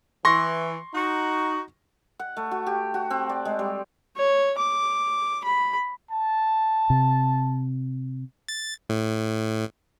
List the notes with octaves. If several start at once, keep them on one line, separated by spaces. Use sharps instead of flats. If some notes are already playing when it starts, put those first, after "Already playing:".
E3 C6 C#6 A#6
D#4 F#4
F#5
A3
F#4
G4
F#4
C4
D5
G#3
G3
C#5
D6
B5
A5
C3
A6
A2